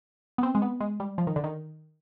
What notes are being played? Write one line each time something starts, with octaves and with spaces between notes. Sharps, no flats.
B3
C4
G#3
B3
G#3
G3
F3
D#3
D3
D#3